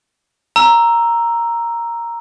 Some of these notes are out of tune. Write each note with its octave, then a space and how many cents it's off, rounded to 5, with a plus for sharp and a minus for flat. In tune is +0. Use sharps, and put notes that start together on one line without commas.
A#5 +0 E6 +10